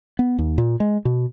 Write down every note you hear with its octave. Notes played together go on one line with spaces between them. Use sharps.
B3
D#2
A#2
G#3
B2